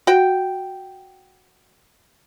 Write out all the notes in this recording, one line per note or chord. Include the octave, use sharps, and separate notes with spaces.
F#4 G5